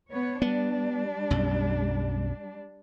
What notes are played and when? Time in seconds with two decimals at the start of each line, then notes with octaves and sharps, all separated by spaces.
0.10 B3 C#5
0.42 G3 B3 D4
1.30 B1 F#2